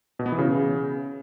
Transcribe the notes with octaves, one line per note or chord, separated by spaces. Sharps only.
B2
B3
E3
C#3